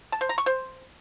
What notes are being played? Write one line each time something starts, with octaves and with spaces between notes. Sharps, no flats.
A5
C5
A#5
C#6
C5